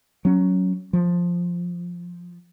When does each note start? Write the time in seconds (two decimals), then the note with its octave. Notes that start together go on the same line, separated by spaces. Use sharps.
0.25 F#3 C#4
0.93 F3